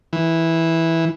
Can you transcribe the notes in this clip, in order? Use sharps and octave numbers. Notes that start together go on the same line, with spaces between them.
E3